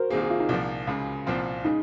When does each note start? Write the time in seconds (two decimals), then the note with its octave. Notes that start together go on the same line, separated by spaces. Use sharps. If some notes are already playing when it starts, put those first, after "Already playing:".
Already playing: F#4 A#4 C5
0.10 C2 C3 D#3 A#3 G#4
0.21 G#4
0.30 F4
0.40 D#4
0.49 C2 A#2 F3
0.87 C#2 C#3 G#3
1.27 C2 A#2 F3 C4 F4
1.64 C#3 G#3 D#4